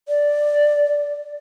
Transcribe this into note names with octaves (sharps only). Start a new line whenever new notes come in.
D5